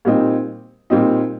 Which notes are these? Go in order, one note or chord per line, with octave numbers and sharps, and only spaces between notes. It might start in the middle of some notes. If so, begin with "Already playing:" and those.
A#2 G3 C4 D#4
A#2 G3 C4 D#4